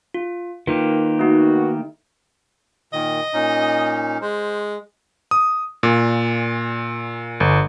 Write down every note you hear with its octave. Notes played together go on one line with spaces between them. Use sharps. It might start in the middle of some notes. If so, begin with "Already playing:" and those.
F4
D#3 A#3 F4 G4 B4
A3 B3 D#4 F#4
A#2 D#3 D#5
A#2 C#4 D#4
G#3 C5
D#6
A#2
G1